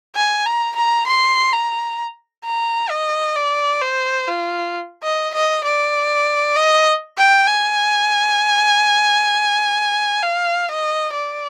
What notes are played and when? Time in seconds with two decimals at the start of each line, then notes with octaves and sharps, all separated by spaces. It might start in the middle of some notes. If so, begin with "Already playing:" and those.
0.15 G#5
0.46 A#5
0.76 A#5
1.07 C6
1.53 A#5
2.45 A#5
2.89 D#5
3.35 D5
3.81 C5
4.28 F4
5.03 D#5
5.34 D#5
5.64 D5
6.55 D#5
7.17 G5
7.47 G#5
10.22 F5
10.68 D#5
11.14 D5